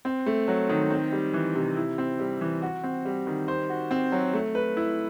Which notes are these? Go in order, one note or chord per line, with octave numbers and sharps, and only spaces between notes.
C4
A3
F#3
D#3
C4
G3
E3
C3
E4
C4
G3
E3
F#4
C4
G3
D#3
C5
F#4
C4
F#3
A3
B4
E4